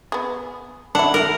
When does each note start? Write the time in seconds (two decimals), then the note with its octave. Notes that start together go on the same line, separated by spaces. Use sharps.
0.12 B3 G#4
0.95 D4 E4 F#5
1.14 A#4